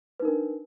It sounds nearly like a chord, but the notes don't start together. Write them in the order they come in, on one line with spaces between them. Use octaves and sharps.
B4 D#4 A#4 D4